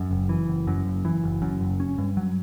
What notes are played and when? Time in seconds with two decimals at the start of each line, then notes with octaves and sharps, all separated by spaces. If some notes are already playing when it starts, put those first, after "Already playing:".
Already playing: F#2
0.11 F#1
0.29 E3
0.48 F#1
0.67 F#2
0.85 F#1
1.05 E3
1.24 F#1
1.42 F#2
1.61 F#1
1.80 C#4
1.98 G2
2.17 F#3